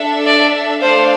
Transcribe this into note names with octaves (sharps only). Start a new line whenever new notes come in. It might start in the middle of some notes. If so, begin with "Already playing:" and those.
Already playing: D4 A4 E5
D5
A3 D4 A4 C5 D5 F5